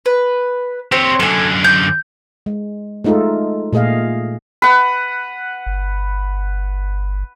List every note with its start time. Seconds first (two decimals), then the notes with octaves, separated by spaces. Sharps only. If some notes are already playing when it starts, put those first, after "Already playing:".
0.06 B4
0.92 C4 G4 C#5
1.20 F#2 D3 A4 G#5
1.64 G6
2.46 G#3
3.04 G#3 A3 D#4 F4 A4
3.73 A#2 A3 G#4 D#5 F5
4.62 B4 F#5
5.66 G1